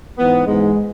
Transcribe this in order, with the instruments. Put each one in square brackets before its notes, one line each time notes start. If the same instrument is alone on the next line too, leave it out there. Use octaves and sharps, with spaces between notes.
[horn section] G#2 E3 B3
G#2 E3 G#3